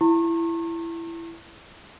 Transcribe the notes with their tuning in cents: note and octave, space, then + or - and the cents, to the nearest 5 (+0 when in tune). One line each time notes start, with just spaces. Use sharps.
E4 +15 A#5 -45 C#6 -35